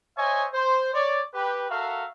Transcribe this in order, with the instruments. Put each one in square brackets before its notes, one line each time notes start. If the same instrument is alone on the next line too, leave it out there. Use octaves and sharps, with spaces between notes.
[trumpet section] C5 C#5 D#5 E5 G#5 C#6
C5
C#5 D5
G4 B4
F#4 A4 A#4 E5 F5